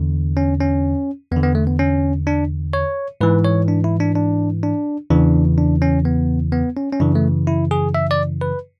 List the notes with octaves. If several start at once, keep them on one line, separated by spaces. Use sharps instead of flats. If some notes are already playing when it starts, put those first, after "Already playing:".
Already playing: E2 D3
C#4
C#4
E2 D3 B3
B3
A3
B3
C#4
D4
C#5
G#2 E3 B4
C#5
D4
E4
D4
D4
D4
E2 C#3 E3 D4
D4
C#4
B3
B3
C#4
C#4
F#2 C#3 E3 D4
A3
E4
G#4
E5
D5
B4